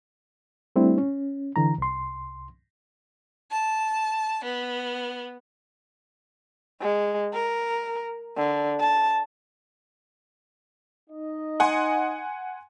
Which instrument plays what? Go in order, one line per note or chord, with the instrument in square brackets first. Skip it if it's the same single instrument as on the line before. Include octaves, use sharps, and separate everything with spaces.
[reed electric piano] G3 A3 C4 D4 E4
C#4
D3 E3 A#5
C2 C6
[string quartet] A5
B3
[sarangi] G#3
A#4
D3
A5
[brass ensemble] D#4 D#5
[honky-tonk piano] F#5 G#5 C6